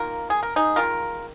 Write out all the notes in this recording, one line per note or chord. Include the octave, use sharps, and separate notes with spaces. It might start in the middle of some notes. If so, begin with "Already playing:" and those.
Already playing: D#3 A#3 F4 A#4
G#4
A#4
D#4 G#4
D#3 G#3 F4 A#4